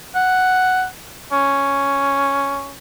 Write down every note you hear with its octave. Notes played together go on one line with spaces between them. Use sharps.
F#5
C#4